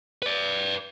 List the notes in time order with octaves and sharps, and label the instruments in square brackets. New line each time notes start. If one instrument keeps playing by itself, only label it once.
[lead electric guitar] B4 D5